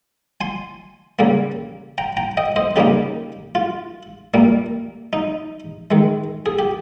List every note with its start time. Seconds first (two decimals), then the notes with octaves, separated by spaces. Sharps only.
0.41 G#5 C6
1.19 C#3 G3 A#3
1.98 G5 A#5
2.17 G5 A#5
2.37 D#5 G5
2.56 C5 D#5
2.76 C#3 G3 A#3 D#4 G4
3.55 F4
4.34 A#2 G3 A#3
5.13 D#4
5.91 D#3 G#3
6.46 G#4
6.59 G4